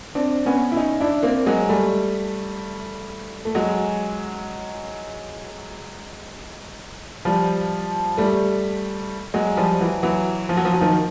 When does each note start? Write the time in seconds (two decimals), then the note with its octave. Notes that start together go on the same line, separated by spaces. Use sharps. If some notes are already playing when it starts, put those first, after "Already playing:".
0.15 C4 D4
0.46 B3 C#4
0.72 E4
0.76 C#4 D#4
1.00 D4 E4
1.23 A#3 C4
1.46 F#3 G#3
1.69 G3 A3
3.45 A3
3.55 F#3 G#3
7.25 F3 G3
8.17 G3 A3
9.34 F#3 G#3
9.57 F3 G3
9.81 E3 F#3
10.03 E3 F#3
10.49 F3
10.57 F#3
10.65 F3
10.73 F#3
10.81 D#3 F3